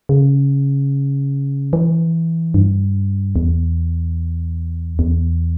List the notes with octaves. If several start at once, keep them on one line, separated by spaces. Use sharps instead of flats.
C#3
E3
G2
E2
E2